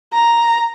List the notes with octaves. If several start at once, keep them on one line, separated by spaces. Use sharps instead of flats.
A#5